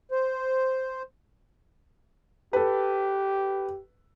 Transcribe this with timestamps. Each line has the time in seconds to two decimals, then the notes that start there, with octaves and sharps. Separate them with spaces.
0.11 C5
2.53 G4 A4 B4